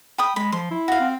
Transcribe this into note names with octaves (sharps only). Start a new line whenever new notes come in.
G5 B5 D#6
G#3 B5
F3 C6
E4
F#4 F5
C4